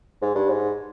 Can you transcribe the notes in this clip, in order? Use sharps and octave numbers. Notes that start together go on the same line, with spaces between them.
G#2
G2
G#2